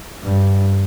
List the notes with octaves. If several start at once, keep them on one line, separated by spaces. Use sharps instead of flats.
G2